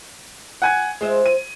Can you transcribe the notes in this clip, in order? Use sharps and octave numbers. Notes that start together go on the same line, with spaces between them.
F#5 G#5 G#6
G#3 F4 C5 E5
D#7